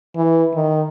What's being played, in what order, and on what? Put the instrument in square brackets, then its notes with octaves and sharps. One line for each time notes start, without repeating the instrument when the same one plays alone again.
[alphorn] E3
D#3